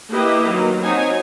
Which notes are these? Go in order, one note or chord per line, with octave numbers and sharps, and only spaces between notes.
A#3 E4 G4 B4 D#5
D#3 F#3 A#3
F#3 C4 D#4 C#5 G#5